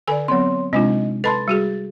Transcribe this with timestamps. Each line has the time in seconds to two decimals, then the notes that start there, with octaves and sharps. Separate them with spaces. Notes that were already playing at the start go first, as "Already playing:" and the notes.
0.08 D3 A4 D5 G#5 E6
0.28 F#3 B3 C4 C#5 C6
0.73 C3 G#3 C4 D4 D#4 F4 D#5
1.24 A4 B4 D#5 A5 B5 C6 A6
1.48 G3 F#4 G#4